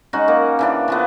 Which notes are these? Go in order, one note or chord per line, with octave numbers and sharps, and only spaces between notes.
G#3 C#4 D#4 F#4
A#3 D#4
C#3 E3 D4
C#3 F3 B3